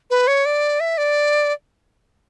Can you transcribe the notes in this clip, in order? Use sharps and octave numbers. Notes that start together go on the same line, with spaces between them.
B4
C#5
D5
E5
D5